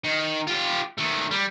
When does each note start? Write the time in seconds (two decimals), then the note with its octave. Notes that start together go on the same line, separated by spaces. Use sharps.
0.04 D#3
0.47 F4 G4
0.98 D#3 A3
1.31 G3